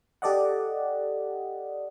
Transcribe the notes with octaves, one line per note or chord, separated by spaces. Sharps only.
G4 A4 D5 D#5 F#5